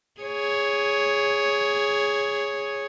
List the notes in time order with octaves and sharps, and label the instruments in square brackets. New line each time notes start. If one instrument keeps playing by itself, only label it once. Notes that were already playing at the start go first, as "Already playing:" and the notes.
[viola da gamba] G#4 C#5